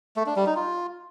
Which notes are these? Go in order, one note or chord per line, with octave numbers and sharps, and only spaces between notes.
A3
D4
G3
D#4
F4